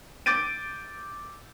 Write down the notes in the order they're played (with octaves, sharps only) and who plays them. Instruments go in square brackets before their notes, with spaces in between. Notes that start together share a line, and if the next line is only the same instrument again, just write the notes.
[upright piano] D6 G6 A6 D7 D#7